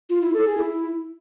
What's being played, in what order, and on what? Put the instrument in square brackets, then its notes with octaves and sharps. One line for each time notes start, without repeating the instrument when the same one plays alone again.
[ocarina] F4
E4
A4
G#4
E4